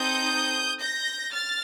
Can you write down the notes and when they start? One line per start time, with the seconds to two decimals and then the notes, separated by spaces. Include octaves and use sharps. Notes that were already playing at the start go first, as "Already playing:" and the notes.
Already playing: C4 D#4 A4 D#6 G6
0.81 G6 A#6
1.32 F6 A6